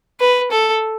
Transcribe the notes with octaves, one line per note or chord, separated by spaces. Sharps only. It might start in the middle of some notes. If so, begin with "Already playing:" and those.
B4
A4